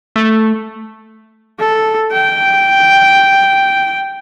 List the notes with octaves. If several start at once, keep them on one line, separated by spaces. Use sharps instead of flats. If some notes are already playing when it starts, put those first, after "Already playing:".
A3
A4
G5